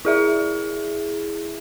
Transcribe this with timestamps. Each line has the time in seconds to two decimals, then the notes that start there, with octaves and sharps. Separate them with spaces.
0.05 E4 G#4 E5